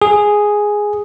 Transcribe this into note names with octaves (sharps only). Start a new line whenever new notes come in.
G#4